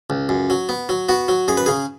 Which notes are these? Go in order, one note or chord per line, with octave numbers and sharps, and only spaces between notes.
C#2
F#2
F#3
B3
F#3
B3 F#4
F#3
F#2 G#4
B4
C#3 G#4